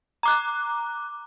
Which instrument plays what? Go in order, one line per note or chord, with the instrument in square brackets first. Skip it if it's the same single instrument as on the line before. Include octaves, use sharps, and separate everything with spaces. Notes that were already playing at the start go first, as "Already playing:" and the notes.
[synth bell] A#5 D6 F#6